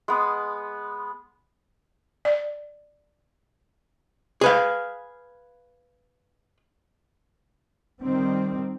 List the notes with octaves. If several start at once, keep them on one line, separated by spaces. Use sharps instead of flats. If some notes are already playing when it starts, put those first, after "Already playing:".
G#3 B3
D5
G#4 B4 F5
D#3 G3 C4